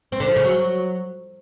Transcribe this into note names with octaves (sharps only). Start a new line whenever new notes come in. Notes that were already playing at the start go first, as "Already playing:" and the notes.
C4
D3
F3
C#3
F#3